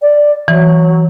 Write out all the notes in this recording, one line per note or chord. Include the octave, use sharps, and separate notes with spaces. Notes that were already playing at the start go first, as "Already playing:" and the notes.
D5
E3 F#3